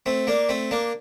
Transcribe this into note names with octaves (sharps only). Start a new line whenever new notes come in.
A3 C4
A#3 D4
A3 C4
A#3 D4